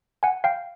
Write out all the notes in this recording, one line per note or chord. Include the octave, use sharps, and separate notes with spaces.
F#5 G#5
F5 G5